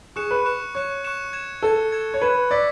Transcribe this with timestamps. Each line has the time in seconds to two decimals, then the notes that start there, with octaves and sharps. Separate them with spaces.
0.16 G#4 C#6 F#6 C#7 E7
0.31 B4
0.45 C#6 F#6 C#7 E7
0.75 C#5 C#6 F#6 C#7 E7
1.04 C#6 F#6 C#7 E7
1.33 G#6 C#7 E7
1.62 A4 G#6 C#7 E7
1.92 G#6 C#7 E7
2.14 C#5
2.21 B4 G#6 C#7 E7
2.51 D5 E6 G#6 B6